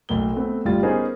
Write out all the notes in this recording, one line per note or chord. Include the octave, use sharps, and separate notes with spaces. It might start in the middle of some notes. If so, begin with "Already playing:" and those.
B1 A2 A#3 G7
A3 B3 C4
G1 A2 G3 F4 G5 A6
B3 C#4 D#4 G#4 A#4 C5